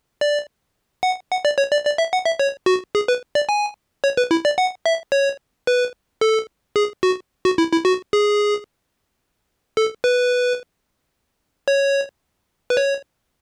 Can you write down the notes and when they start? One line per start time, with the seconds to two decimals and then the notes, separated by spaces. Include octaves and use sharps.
0.21 D5
1.03 F#5
1.31 F#5
1.45 D5
1.58 C#5
1.72 D5
1.85 D5
1.98 E5
2.13 F#5
2.26 E5
2.39 C#5
2.66 F#4
2.95 G#4
3.08 B4
3.35 D5
3.49 G#5
4.04 C#5
4.17 B4
4.31 E4
4.45 D5
4.58 F#5
4.86 E5
5.12 C#5
5.67 B4
6.21 A4
6.76 G#4
7.03 F#4
7.45 F#4
7.58 E4
7.72 E4
7.85 F#4
8.13 G#4
9.77 A4
10.04 B4
11.68 C#5
12.70 B4
12.77 C#5